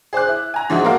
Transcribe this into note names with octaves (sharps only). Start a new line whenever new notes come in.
G#4 C5 D6 F#6
E4
G#5 A#5
G#2 D3 F3 G#3 E4 F#4
A#3 F#4 A4 A#4 F5